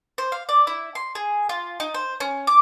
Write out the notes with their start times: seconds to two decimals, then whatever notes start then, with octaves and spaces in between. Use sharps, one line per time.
0.18 C5
0.32 F5
0.49 D5
0.67 E4
0.95 C6
1.15 G#4
1.49 F4
1.80 D#4
1.94 C5
2.20 C#4
2.47 D6